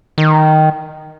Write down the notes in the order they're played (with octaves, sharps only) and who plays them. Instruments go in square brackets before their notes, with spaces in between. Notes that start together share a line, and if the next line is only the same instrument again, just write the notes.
[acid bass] D#3